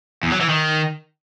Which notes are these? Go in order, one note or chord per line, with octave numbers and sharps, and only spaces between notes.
E2
F#3
E3
D#3